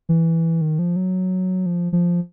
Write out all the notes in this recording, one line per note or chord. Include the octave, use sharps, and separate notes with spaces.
E3
D#3
F3
F#3
F3
F3